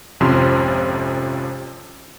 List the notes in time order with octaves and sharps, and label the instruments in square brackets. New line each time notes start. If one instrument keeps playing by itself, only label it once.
[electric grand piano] G#1 F2 C3 F3 C#4 C6